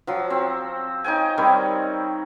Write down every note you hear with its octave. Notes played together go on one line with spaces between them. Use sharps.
F3 F#3
C4
D#4 C#5 G5 G#5
D#3 G3 C4 C#5